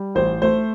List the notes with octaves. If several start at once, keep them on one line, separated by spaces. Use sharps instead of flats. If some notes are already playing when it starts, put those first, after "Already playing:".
Already playing: G3
A1 C5
A3 C5